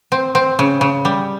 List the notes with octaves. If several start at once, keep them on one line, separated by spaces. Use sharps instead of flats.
C4
C4
C#3
C#3
G3